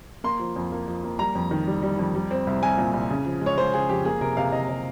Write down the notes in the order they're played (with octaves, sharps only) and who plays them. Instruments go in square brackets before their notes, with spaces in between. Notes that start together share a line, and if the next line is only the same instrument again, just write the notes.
[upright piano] A#3 C6
F3
F2
A#3
F3
A#3
G3 A#5
F2
D#3
G3
G3
F2
G3
C4
C2
C2 G#5
A#2
C2
C#3
F3
G#3
C#5
G#3 C5
C#3 G#4
F2 G4
A#3 G#4
C3 A#4
C3 F5
C3 D#5
C3